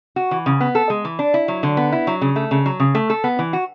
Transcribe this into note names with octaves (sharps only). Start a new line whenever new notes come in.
F#4
E3
C#3
B3
A4
G#3
E3
D4
E4
F#3
D3
B3
E4
F#3
C#3
A3
C#3
F#3
C#3
A3
A4
B3
E3
F#4